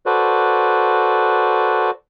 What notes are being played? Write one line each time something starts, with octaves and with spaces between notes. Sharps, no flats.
F#4 A4 B4 C5 D5